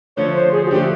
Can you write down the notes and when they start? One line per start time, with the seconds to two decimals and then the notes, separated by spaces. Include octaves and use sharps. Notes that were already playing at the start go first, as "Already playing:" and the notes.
0.17 D3 F3 A3 C#5
0.35 C5
0.52 G#4
0.65 F#4
0.71 D3 F3 A3 G4